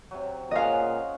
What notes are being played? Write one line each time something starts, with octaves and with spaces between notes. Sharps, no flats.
C3 F#3
A#2 G#3 C#4 D#5 F5 F#5